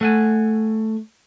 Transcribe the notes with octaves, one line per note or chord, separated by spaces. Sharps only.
A3 F#5 G#5